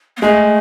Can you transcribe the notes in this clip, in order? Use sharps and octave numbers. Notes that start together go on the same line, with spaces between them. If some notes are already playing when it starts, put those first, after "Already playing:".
B3
G#3 A3